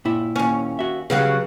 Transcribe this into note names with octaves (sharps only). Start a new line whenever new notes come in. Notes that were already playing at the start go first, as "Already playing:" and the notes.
A#2 E4
D#2 C#4
F#4 E5
C#3 F#3 G3 G#4 B4 F5